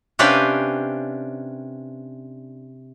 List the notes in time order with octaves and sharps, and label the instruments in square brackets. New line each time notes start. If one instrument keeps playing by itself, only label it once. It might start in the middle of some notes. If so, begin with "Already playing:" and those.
[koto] C3 C#4 D4 B4 F5 G5